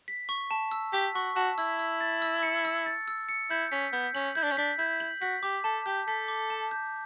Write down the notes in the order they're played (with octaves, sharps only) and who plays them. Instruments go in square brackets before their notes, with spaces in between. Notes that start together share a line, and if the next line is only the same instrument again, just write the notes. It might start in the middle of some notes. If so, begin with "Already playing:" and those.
[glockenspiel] B6
C#6
A5
E6
[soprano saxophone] G4 [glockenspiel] B6
[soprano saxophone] F#4 [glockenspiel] C#6
[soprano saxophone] F#4 [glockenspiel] A5
[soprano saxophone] E4 [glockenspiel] E6
[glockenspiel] E6
A6
E6
C#7
E6
A6
E6
C#7
[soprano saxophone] E4 [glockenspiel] G6
[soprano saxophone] C#4 [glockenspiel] B6
[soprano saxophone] B3 [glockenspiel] G6
[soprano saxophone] C#4 [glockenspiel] F#7
[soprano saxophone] E4 [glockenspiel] G6
[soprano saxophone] D4
C#4
[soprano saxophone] D4 [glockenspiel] B6
[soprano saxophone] E4 [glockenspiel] G6
[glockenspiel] F#7
[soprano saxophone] F#4 [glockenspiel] B6
[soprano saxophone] G4 [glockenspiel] D6
[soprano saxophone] A4 [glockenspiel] A5
[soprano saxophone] G4 [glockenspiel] G6
[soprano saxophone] A4 [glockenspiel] B6
[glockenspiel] D6
A5
G6